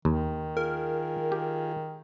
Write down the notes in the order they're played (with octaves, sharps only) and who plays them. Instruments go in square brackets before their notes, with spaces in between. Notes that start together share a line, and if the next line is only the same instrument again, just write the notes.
[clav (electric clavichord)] D#2 [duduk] D#3
[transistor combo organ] F4 G#4 [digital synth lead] A#4
[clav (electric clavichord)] G4